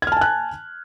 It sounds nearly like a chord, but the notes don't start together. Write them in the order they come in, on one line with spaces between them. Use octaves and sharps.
G#6 F6 A5 G#5 F#6